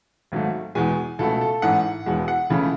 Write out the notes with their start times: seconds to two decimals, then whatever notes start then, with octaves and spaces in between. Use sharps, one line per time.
0.32 G#1 G#2 F#3 A3
0.75 E2 B2 G#3 G#5
1.19 C#2 B2 A3 A4
1.41 A4
1.62 A1 G#2 E3 F#5
2.06 E1 E2 B2 G#3
2.28 F#5
2.50 C#2 C#3 E3 A3